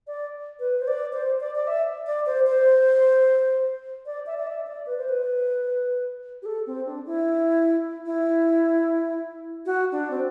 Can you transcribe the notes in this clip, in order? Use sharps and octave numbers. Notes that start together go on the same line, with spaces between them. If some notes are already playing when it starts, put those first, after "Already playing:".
D5
B4
C5
D5
C5
D5
D5
E5
D5
C5
C5
D5
E5
D5
E5
D5
B4
C5
B4
G4
A4
C4
D4
E4
E4
F#4
D4
C4